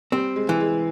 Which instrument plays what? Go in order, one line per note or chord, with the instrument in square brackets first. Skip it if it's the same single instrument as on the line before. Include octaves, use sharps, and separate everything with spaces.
[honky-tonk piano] G3 [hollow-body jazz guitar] C4
[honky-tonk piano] G#3
[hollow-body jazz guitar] E3
[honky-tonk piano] G#3